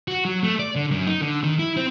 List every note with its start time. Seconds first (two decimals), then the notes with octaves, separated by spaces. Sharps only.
0.08 F#4
0.25 F#3
0.43 A3
0.59 D5
0.76 D3
0.91 F#2
1.07 D#4
1.21 D3
1.44 D#3
1.59 E4
1.77 C4